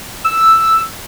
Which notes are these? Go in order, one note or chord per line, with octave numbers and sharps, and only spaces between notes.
E6